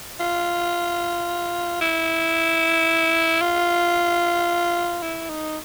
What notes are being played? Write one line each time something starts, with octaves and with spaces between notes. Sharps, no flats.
F4
E4
F4
E4
D#4